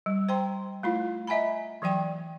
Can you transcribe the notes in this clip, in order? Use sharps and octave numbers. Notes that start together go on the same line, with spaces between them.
G3
C5 G5 A#5 C6
A3 E4 F4
D#5 E5 F#5 G#5 A#5 B5
E3 F#3 D5 G5 D6